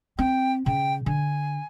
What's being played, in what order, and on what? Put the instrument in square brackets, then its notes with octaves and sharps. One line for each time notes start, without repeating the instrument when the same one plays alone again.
[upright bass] C4 [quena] G5
[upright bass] C#3 [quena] G5
[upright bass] D3 [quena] G#5